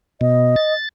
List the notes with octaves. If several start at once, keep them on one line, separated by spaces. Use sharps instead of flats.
B2 D#5
A6